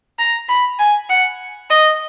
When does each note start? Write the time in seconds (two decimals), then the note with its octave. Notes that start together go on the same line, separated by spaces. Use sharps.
0.19 A#5
0.49 B5
0.79 G#5
1.09 F#5
1.70 D#5